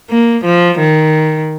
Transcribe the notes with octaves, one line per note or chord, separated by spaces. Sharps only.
A#3
F3
D#3